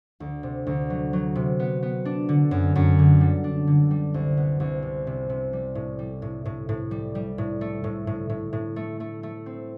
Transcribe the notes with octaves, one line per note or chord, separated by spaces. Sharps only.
D2
C3
D2
F#3
F#3
C3
B3
B3
D4
D3
F#2
F#2
D3
G3
D4
D3
G3
C2
B3
C2
C3
C3
C3
G3
A2
G3
A2
A2
A2
G3
G3
A2
A3
A2
A2
A2
A2
A3
A3
A3
C4